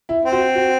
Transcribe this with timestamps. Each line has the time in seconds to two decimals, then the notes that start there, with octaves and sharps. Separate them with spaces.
0.09 E4
0.25 C4
0.32 F#4
0.55 F#4